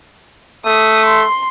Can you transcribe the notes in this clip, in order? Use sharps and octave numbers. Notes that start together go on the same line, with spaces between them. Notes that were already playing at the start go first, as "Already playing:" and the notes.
A3 D#6
C6